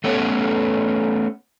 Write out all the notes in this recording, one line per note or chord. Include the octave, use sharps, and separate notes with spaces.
A3 B3 C#4 G4 A4 C#5